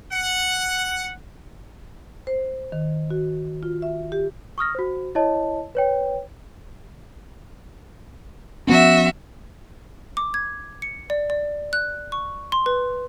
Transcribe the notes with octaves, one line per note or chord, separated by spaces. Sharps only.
F#5
C5
D#3
F#4
F4
E5
G4
C#6 D#6 F6 A#6
F#4 C5
E4 C#5 D#5 A5
B4 C#5 G5
F3 B3 C#4 F#4 E5
D6
G#6
C#7
D5
D5
F#6
C#6
C6
B4